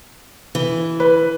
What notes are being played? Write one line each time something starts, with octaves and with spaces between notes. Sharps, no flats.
E3
B4